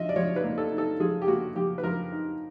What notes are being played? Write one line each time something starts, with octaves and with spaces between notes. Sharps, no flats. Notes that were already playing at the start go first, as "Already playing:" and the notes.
Already playing: F3 D#5 E5
D5
F3 C#5
B4
A#3
A4
D#4
A4
F3 G#4
G4
A#3 F#4
F3 G4
B4
F3 A#4
D#4